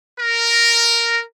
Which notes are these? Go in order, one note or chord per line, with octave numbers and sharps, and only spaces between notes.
A#4